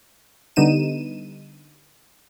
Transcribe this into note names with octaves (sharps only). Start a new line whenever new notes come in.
D3 G3 B3 D#4 D#7 E7